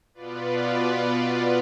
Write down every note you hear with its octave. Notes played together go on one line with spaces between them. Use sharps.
B2 B3 F4 B4 D5